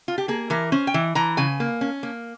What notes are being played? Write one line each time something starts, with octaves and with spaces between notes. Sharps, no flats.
F4
G4
A#3 G#4
E3 A#4
C#4 C5
G5
E3
E3 A#5
C#3 G#5
A#3
C#4
A#3